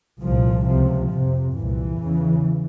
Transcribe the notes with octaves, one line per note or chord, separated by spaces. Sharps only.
C2 A#2 F3
C#2 C3 F3
F2 C3
C2 A#2 E3
E2 C#3